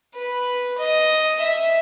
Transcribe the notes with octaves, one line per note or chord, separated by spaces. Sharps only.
B4
D#5
E5